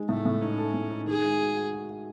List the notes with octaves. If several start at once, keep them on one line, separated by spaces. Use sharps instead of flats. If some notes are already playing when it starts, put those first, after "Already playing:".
Already playing: G#3 D#4
A2 A3
A2
C#4 D#4
A4
A2
D#4
D#3 G#4
G#3
F#4
F#4
F#4
F#4